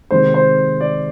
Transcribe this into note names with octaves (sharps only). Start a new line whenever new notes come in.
C3 D#3 G#3 C5
C5
D5